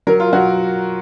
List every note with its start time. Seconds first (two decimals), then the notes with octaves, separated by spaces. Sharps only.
0.07 F#3 A#4
0.20 F4
0.33 F#3 F#4